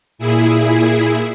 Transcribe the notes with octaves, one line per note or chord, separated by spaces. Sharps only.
A#2 E4 G#4